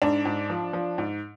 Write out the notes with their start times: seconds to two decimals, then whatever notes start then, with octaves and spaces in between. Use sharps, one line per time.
0.02 G#2 D4
0.25 G#2
0.50 F3
0.73 F3
0.98 G#2